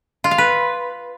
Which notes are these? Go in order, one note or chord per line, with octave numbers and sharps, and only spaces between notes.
F4
F5
B4